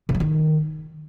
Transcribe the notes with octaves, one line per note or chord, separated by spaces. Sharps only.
C#3
F3
D#3